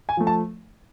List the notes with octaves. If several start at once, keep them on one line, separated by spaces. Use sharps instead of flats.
G#5
F3 A3
A5